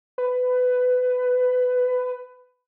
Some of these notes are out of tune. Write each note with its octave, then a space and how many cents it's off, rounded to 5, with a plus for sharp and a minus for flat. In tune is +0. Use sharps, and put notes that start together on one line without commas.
B4 +20